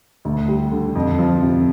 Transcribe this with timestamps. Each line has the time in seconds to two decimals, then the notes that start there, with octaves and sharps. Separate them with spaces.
0.25 D2
0.48 G3
0.72 D3
0.95 F2
1.19 F3
1.42 C3